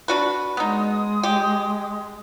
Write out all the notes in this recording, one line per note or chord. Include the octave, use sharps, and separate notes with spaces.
D4 F#4 B4
G#3 B3 D#4 D#6
G4